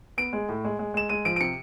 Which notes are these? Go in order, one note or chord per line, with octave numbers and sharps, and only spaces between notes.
B3 D7
G#3
A2
G#3
G#3
G#3 E7
G#3 D#7
F3 D7
D7
C3 C#7